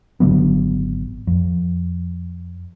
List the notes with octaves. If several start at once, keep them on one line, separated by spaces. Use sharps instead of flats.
G#1 D3 F#3 B3
F2